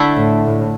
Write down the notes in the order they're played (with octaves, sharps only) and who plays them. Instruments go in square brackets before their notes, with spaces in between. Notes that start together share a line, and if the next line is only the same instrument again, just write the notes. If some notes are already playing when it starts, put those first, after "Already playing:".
Already playing: [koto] D3 A3 E4
[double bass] A2
A2